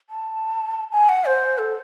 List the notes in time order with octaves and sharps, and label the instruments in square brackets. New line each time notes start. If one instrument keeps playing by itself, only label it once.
[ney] A5
G#5
F#5
C5
A4